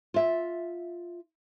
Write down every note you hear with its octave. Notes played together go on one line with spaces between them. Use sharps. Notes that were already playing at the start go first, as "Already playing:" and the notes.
F4 E5